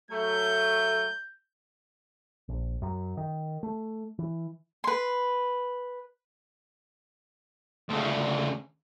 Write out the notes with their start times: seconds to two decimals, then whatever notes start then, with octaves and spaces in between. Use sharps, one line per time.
0.11 F#3 A3 G6
2.49 A#1
2.82 F#2
3.17 D#3
3.63 A3
4.19 E3
4.84 B4 C6
7.89 D2 C#3